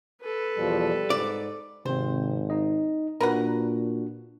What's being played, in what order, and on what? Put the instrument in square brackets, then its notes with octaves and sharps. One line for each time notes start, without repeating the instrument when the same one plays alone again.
[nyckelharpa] A4 B4
[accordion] E2 B2 F3 [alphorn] G3
[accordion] G#2 [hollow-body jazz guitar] D5
[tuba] G#1 [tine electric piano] C3 C4 [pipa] C5
[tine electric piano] D#4 D#5
[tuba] A#2 [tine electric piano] D4 F#4 [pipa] A#4 B4 F#5